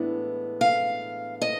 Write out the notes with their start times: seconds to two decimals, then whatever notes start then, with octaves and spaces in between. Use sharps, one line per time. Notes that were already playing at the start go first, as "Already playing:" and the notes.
Already playing: A2 E3 G#3 B3 D4
0.61 F5
1.42 D#5